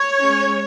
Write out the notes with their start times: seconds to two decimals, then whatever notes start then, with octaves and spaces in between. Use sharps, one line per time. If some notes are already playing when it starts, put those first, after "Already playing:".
Already playing: C#5
0.21 G#3 C#4